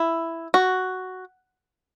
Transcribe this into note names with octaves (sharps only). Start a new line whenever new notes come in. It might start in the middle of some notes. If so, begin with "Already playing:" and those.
Already playing: E4
F#4